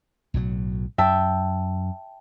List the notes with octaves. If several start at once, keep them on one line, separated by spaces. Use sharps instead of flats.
B1 A2 F#3
F#2 E5 G5 A5